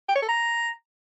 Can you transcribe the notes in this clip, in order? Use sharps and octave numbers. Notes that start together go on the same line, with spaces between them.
G5
C#5
A4
A#5